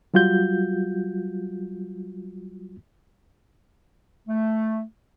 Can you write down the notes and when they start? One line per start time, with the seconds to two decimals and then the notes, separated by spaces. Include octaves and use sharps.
0.14 F#3 G3 F4 F#4 G6
4.28 A3